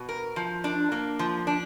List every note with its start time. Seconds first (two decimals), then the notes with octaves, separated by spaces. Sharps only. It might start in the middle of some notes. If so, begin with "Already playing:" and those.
Already playing: B2
0.09 A#4
0.36 F3
0.64 D4
0.92 A#3
1.19 F3
1.47 D4